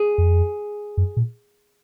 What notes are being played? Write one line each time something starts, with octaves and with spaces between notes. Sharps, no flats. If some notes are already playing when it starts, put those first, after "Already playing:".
Already playing: G#4
F2
F#2
A#2